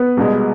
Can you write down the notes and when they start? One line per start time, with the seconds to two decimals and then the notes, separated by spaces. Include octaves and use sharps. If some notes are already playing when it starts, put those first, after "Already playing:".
Already playing: B3 B4
0.17 C2 B2 G#3